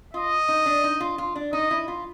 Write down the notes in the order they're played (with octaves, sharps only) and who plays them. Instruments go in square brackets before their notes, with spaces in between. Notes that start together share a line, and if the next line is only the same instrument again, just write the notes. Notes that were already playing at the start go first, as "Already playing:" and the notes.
[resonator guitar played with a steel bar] F4 [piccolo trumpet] D#5
[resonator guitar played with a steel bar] D#4
D4
D#4
F4
F4
D4
[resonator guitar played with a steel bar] D#4 [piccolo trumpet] D#5
[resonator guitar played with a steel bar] E4
F4